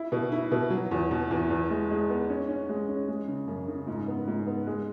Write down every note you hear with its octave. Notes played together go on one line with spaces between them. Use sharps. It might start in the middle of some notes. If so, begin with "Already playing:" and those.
Already playing: E4
B2
E4
B2
F#3
E2
B2
E2
E2
G#3
G#3
B3
C#4
C#4
G#3
C#4
G#3
C#3
F#2
C#3
G#2
B3
G#2
B3
G#3